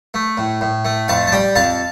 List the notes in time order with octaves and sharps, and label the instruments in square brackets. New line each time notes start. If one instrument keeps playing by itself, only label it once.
[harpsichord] A3
A2
A2
A3
F2 F5 A5
A5
G3 D5 G5
F2 F5 A5